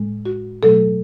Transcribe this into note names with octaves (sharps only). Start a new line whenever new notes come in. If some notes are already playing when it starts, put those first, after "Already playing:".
Already playing: A2 G#3
F#4
B2 F#3 A3 A4